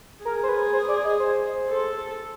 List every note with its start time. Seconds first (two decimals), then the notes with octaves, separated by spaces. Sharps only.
0.24 G#4 A#4
0.43 C5
0.49 B4
0.73 C5
0.88 D5
1.05 D#5
1.20 C5
1.69 A4